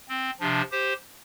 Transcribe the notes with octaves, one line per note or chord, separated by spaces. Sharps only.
C4
C3 F3 D4
G4 C5